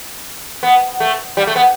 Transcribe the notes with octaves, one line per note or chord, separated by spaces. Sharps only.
B3
A3
G3
A3
B3